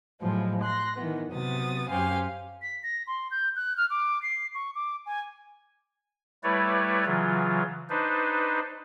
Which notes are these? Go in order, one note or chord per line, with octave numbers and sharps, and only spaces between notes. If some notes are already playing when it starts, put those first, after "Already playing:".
A2 F3 F#3 G#3
C6 F#6 A#6
D#3 E3 B3
C3 F#3 B3 D#6 A6
F#2 C#4 G4 C5 F5 G#5
B6
A#6
C6
G6
F#6
F6
D6
C7
C#6
D6
G#5
G3 A3 E4 B4 C#5 D5
C#3 E3 F#3 F4
D4 D#4 B4 C5